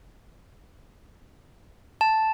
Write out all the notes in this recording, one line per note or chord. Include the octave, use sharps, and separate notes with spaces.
A5